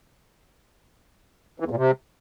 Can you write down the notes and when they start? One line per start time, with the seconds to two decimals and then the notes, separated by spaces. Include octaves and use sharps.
1.60 E3
1.66 E2
1.71 A#2
1.77 C3